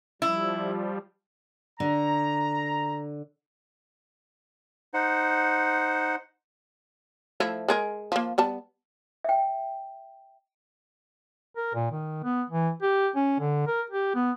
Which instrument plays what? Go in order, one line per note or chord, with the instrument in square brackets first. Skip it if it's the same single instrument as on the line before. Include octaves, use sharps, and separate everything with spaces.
[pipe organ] F3 G3 [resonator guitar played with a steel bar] E4
[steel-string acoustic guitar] D3 [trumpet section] A#5
[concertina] D#4 C5 F#5
[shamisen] F3 A3 E4
G#3 G#4 A#4
F3 A#3
G3 B3 A5
[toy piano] E5 G5
[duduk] A#4
A#2
D#3
B3
E3
G4
C#4
D3
A#4
G4
B3